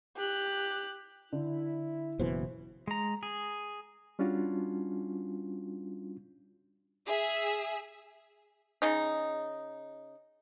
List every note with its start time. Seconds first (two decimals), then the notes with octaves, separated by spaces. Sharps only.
0.17 G4 F#6
1.32 D3 E4
2.19 F#1 B2 E3 C5
2.88 G#3 A#5
3.23 G#4
4.19 G3 C#4 D4 F4 F#4
7.07 G#4 E5
8.82 C#3 D#4